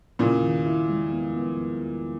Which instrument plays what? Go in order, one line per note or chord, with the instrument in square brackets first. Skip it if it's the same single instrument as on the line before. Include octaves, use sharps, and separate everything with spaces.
[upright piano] A#2 C#3 [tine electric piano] E4
[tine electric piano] D#3
E4
G#3
B3
B3
B3
B3